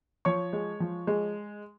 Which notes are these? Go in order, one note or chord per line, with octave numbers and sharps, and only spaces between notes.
F3 C#5 C#6
G#3
F3
G#3